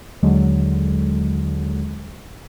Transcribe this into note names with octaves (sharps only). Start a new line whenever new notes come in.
D#2 D3 F#3 G#3